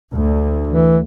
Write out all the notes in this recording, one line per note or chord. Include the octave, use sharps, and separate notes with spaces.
D2
E3